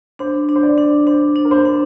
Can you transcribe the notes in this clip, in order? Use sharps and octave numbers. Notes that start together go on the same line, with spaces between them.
D4 C5
D4
C5
D5
D4
D4 C5
D4
A#4
C5
D4